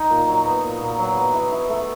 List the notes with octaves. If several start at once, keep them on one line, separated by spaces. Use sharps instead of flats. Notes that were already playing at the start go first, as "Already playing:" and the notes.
Already playing: D#4
A#2
F#3
B3
A#2
A#2
F#3
B3
E3
E3
A3